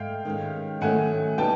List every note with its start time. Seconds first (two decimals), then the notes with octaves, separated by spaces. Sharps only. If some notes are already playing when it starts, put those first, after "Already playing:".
Already playing: G#2 A3 F5 G5
0.25 D#3 G#3 C#4
0.81 D#3 F#3 A3 C#4 F#5 G#5
1.38 B2 G3 B3 D#4 G5 A5